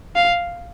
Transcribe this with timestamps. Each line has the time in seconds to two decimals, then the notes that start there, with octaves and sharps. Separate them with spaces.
0.16 F5